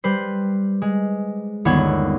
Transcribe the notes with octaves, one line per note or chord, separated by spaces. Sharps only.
G3 B4 C5
G#3
G1 D#2 B3 C#5 F#5 G#6